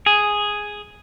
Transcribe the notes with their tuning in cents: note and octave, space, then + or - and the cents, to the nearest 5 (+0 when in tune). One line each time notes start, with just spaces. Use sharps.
G#4 +0